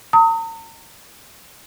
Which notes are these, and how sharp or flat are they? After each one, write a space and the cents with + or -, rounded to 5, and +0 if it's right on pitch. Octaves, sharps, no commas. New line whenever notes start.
A#5 -40 D#6 +30